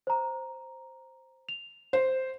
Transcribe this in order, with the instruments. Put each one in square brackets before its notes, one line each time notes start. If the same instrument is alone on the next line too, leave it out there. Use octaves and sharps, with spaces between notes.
[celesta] C5 A#5
F7
[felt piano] C5